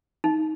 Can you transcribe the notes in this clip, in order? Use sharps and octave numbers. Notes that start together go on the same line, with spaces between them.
D#4